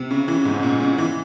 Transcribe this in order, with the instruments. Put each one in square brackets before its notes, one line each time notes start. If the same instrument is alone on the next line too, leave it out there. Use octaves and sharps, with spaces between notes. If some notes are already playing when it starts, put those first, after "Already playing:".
Already playing: [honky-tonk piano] C3
C#3
E3
G#2
A#2
C#3
E3